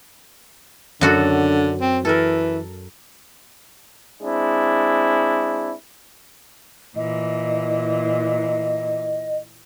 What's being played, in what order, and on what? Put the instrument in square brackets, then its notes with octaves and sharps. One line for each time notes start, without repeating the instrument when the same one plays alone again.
[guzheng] F#2 F#4 A4 [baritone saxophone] D3
[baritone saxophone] C4
[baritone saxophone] E3 [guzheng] A4 A#4
[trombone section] G#3 C4 D4 E4
[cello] A#2 E3 [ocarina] D#5